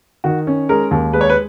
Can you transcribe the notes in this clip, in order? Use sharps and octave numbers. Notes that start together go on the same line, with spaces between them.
D#3 F#4
C#4
G#3 A#4
D#2
G#3 B4
C#5
B4